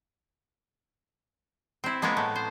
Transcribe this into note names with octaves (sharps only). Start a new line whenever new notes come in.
C4 E4
G#3 A#3 B3 A#4 C#5
A2 A3
C5